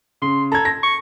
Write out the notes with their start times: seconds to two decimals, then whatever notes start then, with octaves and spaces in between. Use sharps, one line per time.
0.22 C#3 C6
0.52 A4 A#5 G#6
0.65 A#6
0.83 C#6